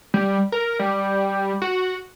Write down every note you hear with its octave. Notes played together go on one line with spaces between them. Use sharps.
G3
A#4
G3
F#4